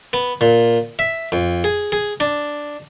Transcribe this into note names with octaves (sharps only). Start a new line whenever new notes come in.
B3
A#2
E5
F2
G#4
G#4
D4